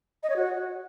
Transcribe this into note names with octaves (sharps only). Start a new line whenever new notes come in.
D#5
C#5
F#4